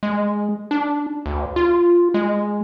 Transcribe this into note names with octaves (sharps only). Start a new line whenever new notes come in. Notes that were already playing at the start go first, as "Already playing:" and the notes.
G#3
D4
D2
F4
G#3